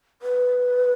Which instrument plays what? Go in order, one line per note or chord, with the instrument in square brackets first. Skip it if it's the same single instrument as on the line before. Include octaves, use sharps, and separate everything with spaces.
[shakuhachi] B4